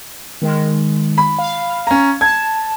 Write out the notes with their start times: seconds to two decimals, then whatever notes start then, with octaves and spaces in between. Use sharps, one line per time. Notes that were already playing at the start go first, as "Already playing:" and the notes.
0.42 D#3 G#3
1.18 B5
1.39 F5
1.87 C#4 A#5
2.21 A5 G#6